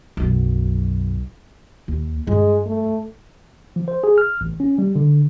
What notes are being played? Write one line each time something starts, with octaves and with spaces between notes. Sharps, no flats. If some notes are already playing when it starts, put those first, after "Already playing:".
B1 F#2
D#2
G2 G#3 F4
A3
F3
C5
G#4
F6
A1
C#4
G3
D3